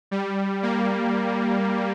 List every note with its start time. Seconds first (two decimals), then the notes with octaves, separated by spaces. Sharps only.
0.11 G3
0.63 A#3